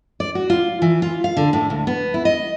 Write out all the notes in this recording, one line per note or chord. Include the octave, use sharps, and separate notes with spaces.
D5
F#4
F4
E3
F4
F5
D3
A2
D2
B3
E4
D#5